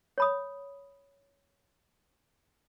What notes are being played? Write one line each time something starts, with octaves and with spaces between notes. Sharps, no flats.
C#5 B5 D#6